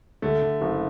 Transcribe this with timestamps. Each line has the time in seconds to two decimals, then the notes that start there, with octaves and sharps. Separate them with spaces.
0.22 D3 A3
0.42 D3
0.61 F#1